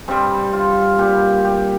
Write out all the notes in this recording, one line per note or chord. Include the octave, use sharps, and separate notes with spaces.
G2 G3 C4
F4
A#2 G3 G4
G4